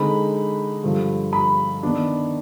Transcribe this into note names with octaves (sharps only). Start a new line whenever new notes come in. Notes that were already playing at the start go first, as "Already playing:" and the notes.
Already playing: D3 G#3 C4 D#4 B5
G2 D3 F3
B5
D#3 B3 D4